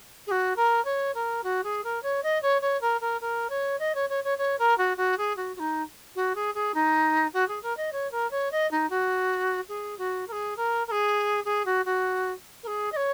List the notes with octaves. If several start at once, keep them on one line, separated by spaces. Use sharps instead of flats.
G#4
F#4
A#4
C#5
A#4
F#4
G#4
A#4
C#5
D#5
C#5
C#5
A#4
A#4
A#4
C#5
D#5
C#5
C#5
C#5
C#5
A#4
F#4
F#4
G#4
F#4
F#4
D#4
F#4
G#4
G#4
D#4
F#4
G#4
A#4
D#5
C#5
A#4
C#5
D#5
D#4
F#4
G#4
F#4
A#4
G#4
A#4
A#4
G#4
G#4
F#4
F#4
A#4
G#4
D#5
C#5